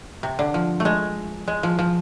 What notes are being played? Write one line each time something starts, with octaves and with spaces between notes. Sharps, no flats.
C3
D3
F3
A3
G#3
G#3
F3
F3